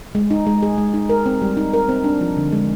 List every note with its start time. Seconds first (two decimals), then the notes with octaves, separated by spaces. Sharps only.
0.15 G#3
0.31 D#4
0.47 G#3
0.63 G#4
0.78 G#3
0.94 D#4
1.09 A#4
1.26 C4
1.42 G3
1.57 D#4
1.74 A#4
1.89 C4
2.04 D4
2.21 F3
2.37 D3
2.52 G#3